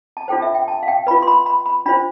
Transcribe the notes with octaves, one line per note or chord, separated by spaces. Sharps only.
A5
D4 F4 A4 C5 G5
E5
G5
A5
F5
G5
F4 B4 B5
C6
B5
B5
B5
D4 F4 C5 B5